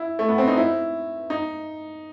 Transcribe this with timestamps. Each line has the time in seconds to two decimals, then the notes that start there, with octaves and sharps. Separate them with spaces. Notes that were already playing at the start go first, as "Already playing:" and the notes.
Already playing: E4
0.19 A3
0.28 B3
0.38 C4
0.48 D#4
0.57 E4
1.30 D#4